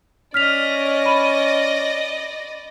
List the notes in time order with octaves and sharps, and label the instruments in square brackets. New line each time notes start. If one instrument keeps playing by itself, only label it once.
[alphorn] C#4 [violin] D5 D#5 [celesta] F6 B6 F7
[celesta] B5 D#7